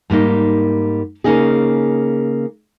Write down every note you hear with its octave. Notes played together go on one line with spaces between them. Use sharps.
G#2 G3 A#3 D#4
C#3 A#3 C#4 D#4 G#4